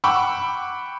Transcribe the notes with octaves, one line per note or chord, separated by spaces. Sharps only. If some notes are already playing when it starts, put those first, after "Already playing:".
F#5 G5 B5 C#6 D6 E6